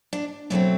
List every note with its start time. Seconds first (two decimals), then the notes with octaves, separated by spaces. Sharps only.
0.13 D4
0.50 B2 F#3 A3 C4 D4